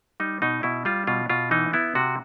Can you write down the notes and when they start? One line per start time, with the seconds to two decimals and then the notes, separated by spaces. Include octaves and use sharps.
0.20 G3 D#4
0.42 B2 D#4
0.63 B2 E4
0.85 G3 F4
1.07 B2 F4
1.30 B2 F4
1.51 E3 D#4
1.73 B3 E4
1.95 C3 F#4